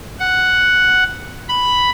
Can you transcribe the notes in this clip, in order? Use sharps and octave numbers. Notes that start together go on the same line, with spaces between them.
F#5
B5